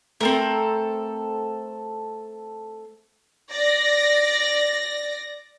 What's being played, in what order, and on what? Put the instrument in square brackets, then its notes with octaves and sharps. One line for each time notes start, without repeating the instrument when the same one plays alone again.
[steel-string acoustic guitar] A3 [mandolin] C4 A4 A#4
[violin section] D5 A#6